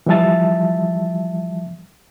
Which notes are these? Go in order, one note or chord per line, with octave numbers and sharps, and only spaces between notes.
E3 F3 G3 E5 A5 A6